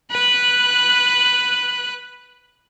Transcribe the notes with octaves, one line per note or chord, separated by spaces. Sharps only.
B4 F#6